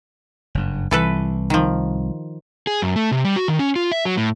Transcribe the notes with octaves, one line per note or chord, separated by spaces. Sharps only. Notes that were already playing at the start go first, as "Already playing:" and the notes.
F#1 G2
C2 E3 A4 B4
D#3 F3
G#4
F#2
A3
C3
G3
F#4
D#3
C#4
F4
E5
F#3
A2